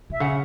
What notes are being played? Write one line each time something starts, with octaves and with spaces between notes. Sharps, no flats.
B2 E5
C#3 F#5